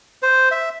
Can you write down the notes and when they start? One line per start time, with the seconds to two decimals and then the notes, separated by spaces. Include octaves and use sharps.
0.23 C5
0.51 E5